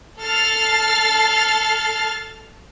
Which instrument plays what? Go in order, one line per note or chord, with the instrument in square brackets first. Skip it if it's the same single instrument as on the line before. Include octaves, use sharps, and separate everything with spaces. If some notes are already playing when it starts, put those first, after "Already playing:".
[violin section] A4 A5 F6 A6 C7